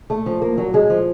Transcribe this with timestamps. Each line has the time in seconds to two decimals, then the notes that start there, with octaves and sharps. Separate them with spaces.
0.10 A3
0.26 F3
0.42 A#3
0.58 F#3
0.74 G#3
0.90 F3